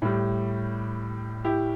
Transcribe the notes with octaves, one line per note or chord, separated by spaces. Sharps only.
A2 G3
E4 G4